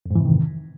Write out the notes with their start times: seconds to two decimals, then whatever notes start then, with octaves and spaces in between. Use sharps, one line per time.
0.06 F2
0.11 G#2
0.15 E3
0.20 C3
0.25 D#3